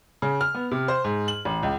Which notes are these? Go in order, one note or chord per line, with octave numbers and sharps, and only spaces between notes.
C#3
F6
B3
C3
C5
G#2
F#7
A1
C#2